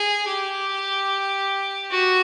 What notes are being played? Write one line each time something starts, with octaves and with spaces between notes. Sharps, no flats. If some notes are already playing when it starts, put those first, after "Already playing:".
Already playing: G#4
G4
F#4